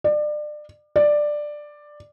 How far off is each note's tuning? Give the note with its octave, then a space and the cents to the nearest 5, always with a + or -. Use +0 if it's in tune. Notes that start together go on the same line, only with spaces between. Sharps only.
D5 +30
D5 +10